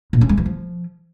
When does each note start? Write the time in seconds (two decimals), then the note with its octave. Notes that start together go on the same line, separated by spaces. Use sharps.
0.13 A#2
0.21 C#4
0.29 G#3
0.37 E3
0.46 F3